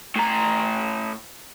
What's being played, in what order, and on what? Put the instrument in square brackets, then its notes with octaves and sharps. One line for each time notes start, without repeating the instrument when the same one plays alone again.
[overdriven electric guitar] A2 A#5